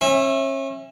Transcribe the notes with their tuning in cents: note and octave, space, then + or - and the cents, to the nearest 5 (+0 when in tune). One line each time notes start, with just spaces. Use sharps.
C#4 -35 E5 +0